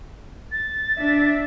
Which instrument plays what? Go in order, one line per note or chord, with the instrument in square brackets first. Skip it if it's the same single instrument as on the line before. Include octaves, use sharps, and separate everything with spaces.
[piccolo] A6
[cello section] D4 E5